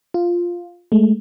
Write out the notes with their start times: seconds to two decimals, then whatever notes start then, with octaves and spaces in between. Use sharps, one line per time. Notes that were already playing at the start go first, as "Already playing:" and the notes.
0.14 F4
0.92 G#3 A3